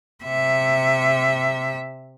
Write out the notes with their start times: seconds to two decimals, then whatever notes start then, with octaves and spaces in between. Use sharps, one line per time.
0.24 C3 E5